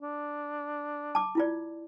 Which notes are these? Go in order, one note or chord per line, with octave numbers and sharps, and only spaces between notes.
D4
A5 D6
E4 F4 D5